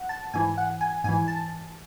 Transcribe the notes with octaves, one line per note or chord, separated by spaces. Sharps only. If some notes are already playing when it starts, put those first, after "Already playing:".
Already playing: F#5
A5
G#2 E3 G#5
F#5
G#5
G#2 E3 G#5
A5